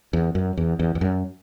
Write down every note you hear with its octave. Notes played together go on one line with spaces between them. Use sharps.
E2
F#2
E2
E2
E2
F#2